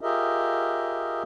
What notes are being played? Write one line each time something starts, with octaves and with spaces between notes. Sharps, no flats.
F4 G4 G#4 A#4 D#5 E5